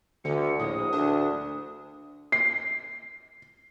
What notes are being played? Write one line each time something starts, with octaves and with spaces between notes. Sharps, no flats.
D2 D3 C#7
A#1 A2 D#6
D2 D4
C7